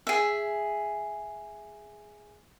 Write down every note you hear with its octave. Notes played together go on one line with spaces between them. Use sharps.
G#4 E5